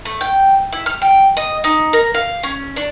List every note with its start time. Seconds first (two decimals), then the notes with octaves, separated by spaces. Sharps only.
0.05 A3
0.21 G5
0.73 E4
0.86 F6
1.02 G5
1.37 D#5
1.64 D#4
1.93 A#4
2.14 F5
2.43 C#4
2.76 D4